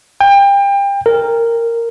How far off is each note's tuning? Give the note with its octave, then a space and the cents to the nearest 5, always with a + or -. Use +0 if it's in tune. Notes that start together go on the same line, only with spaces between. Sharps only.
G5 +30
A#4 -10